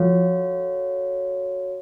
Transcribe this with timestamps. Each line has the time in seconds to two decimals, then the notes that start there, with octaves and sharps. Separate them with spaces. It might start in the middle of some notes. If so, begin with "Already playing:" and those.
Already playing: F3 F#4 A4 C#5 F5